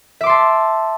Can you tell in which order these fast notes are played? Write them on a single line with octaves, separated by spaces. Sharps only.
E5 D6 C6 A5